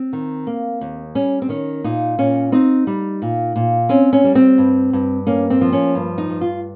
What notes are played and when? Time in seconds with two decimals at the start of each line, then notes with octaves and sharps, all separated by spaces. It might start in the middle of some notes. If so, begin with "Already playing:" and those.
Already playing: C4
0.13 D#3
0.47 A#3
0.81 D#2
1.15 G3 C#4
1.42 C4
1.49 D#3 C#4
1.84 A#2 D#4
2.18 A#2 C#4
2.52 C4 D#4
2.87 G3
3.22 A#2
3.56 A#2
3.89 C4 C#4
4.13 C#4
4.24 G3
4.35 C4
4.58 G2
4.93 G2
5.27 A#3 C#4
5.50 C4
5.61 F3
5.73 C#4
5.95 G2
6.18 D#4
6.30 G2
6.41 F4